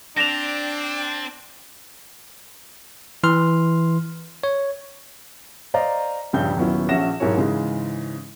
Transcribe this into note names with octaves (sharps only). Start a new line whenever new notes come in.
C4 D4 A#6 E7 F7
E3 C6 F6
C#5
C5 D5 D#5 F5 A#5
A#1 G2 C#3 G3 G5 G6
D#1 F#3 B3 C#4 E4
A#1 C#4 E5 F#5 A#6 E7
B1 G#2 E4 A#4 C#5
G#2 C#3 E3 G#3